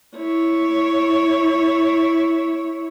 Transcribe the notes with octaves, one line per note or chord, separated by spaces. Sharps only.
E4 C#5